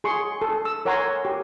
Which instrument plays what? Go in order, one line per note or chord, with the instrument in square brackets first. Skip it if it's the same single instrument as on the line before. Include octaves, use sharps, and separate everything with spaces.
[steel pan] G#4 C6 C#6
A4
E6
A#4 C#5 F#5 G#5 A#5 C6
G4